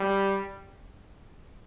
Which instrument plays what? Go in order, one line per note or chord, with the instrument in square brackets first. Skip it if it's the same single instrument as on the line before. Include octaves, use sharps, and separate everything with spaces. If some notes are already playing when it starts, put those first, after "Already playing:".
Already playing: [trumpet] G3